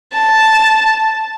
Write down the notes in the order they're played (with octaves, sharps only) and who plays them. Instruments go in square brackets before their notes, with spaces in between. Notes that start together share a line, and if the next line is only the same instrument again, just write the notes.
[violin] A5